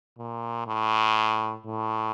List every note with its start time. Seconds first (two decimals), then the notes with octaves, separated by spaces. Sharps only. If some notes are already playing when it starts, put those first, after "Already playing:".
0.18 A#2
0.67 A2
1.66 A2